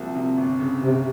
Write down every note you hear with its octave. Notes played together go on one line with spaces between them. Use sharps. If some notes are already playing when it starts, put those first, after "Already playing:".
Already playing: C2 C3 F3 A#3
C3
G1
C#3
G1 C3